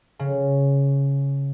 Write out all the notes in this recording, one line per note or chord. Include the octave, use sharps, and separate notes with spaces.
C#3